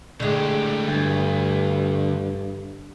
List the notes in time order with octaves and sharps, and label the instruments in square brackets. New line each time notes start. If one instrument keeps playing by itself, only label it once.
[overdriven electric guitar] A2 G4 [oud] D3 G#3
[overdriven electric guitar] D2 [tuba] G2